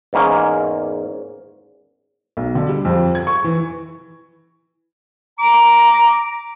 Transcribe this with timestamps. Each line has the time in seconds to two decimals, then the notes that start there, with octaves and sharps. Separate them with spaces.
0.13 E2 G#2 A#3 C#4
2.37 B1
2.55 D3
2.69 G3
2.85 F2
3.15 G#6
3.27 C#6
3.44 E3
5.39 A#5 D6